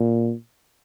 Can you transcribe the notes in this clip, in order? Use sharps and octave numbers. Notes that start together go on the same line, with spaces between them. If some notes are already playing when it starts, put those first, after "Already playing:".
Already playing: A#2